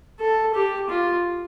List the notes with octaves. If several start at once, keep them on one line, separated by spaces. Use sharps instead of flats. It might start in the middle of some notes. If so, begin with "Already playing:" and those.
A4
G4
F4